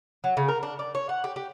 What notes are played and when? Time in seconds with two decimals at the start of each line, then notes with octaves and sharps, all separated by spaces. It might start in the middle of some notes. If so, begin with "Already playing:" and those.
0.24 F#3
0.37 C#3
0.48 A#4
0.63 D4
0.79 D5
0.95 C#5
1.09 F#5
1.24 G4
1.36 G4